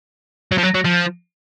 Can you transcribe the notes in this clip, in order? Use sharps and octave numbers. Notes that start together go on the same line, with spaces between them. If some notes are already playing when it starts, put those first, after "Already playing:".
F#3
F3
F#3
F#3
F3